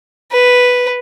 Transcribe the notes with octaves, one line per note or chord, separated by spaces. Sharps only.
B4